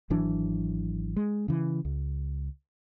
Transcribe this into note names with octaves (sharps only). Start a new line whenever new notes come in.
G#1 E3 F#3 D4
G#3
C#3 E3
C#2